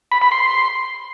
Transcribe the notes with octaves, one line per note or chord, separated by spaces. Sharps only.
B5
B5
C6